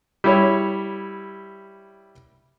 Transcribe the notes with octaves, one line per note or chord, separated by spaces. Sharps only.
G3 E4 C#5